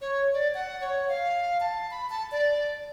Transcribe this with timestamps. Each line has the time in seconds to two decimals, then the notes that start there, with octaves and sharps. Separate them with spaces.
0.01 C#5
0.34 D5
0.54 F#5
0.81 C#5
1.09 F5
1.60 A5
1.91 B5
2.10 A5
2.32 D5